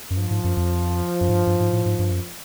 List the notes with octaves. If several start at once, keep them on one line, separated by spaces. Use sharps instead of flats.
F#2
G2 F3
G#2
F#2
F2
F#2
G#2
G2
G2
G#2
A2
G#2
G2
F#2